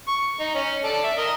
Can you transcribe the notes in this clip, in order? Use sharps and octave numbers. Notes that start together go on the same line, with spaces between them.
C#6
D#4
C#4
A4 D5
E5
A#4 D#5